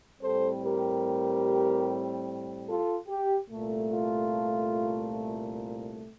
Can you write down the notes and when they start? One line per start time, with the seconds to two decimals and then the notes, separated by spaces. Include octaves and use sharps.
0.21 A2 G3 C4 A4 C5
0.62 G4 A#4
2.67 F4 A4
3.08 G4
3.49 C2 A#2 A3
3.90 F4